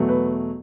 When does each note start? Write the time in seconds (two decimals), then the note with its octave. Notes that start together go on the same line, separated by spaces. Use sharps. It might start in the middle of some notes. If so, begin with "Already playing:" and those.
Already playing: E2 B2 F#3 A3
0.09 B4